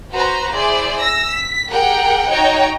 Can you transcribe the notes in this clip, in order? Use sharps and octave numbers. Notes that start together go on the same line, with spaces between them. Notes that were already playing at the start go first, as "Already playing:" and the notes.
F#4 B4 C5 A#5
E4 G#4 C5 D5
E6 A#6
B6
G4 G#4 A#4 F#5 G5
D#4 F#4 C#5 G5 A#5